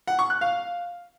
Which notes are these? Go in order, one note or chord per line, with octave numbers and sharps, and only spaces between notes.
F#5
C#6
F#6
F5